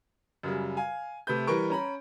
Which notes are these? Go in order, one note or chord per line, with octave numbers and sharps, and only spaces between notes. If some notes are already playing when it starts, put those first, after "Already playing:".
F#2 C#3 G3
F5 G#5
C3 A3 B4 G6
E3 G3 A#4 B4 C#6 D7
C#4 A#5 B5